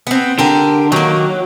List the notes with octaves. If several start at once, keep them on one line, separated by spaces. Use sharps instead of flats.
B3 C4
D3 G4 A#4
D#3 F#3 A#3